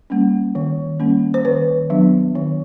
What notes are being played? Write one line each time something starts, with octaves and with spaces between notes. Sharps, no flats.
G3 A#3 C#4
D#3
G3 A#3 C#4
C5
D#3 B4
F#3 B3 D4
D#3